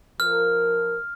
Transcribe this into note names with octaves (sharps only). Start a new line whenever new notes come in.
F3 A#4 F6